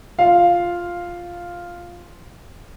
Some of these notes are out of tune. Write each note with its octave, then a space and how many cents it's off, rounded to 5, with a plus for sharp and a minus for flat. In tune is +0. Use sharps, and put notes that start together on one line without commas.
F4 +0 F5 +0